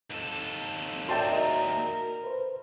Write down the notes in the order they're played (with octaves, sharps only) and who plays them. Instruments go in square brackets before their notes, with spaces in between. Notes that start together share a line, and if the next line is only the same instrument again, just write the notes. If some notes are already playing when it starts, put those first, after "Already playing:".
[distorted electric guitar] D#2 A4
[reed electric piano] F#4 D5 E5 [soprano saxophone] A#4 [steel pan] G5 A5 C6
[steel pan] D#5 A#5
[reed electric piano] B4 C5